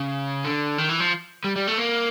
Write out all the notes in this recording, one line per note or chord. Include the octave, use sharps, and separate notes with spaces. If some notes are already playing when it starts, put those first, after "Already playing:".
Already playing: C#3
D3
D#3
E3
F3
G3
G3
A3
A#3